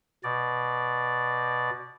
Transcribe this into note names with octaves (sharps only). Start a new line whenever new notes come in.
B2 D5